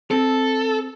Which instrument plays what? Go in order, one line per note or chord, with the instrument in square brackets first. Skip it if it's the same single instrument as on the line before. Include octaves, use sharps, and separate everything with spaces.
[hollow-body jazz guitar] C4 [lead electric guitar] A4